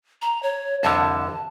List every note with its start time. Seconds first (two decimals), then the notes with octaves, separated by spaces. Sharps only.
0.22 A#5
0.43 C#5
0.83 C2 F2 D3 A5